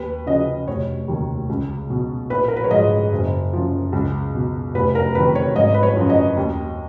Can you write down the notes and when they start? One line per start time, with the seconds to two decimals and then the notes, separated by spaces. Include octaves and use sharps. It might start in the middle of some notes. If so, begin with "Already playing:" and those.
Already playing: D#2 B4
0.26 C#3 F3 D#5
0.67 F1 C#5
1.08 D#2 D#3
1.49 C#2
1.90 B2
2.30 A#1 B4
2.48 A#4
2.56 B4
2.64 C#5
2.71 G#2 F3 D#5
3.12 F#1
3.53 F#2 F3
3.92 C#2
4.34 B2
4.74 F1 B4
4.95 A#4
5.15 F2 D#3 B4
5.35 C#5
5.56 G#1 D#5
5.74 B4
5.83 C#5
5.97 F#2 F3
6.09 D#5
6.37 D#2